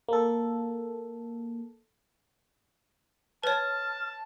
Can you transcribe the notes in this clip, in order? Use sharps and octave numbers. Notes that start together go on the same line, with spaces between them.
A#3 A4
B4 C#5 A5 F6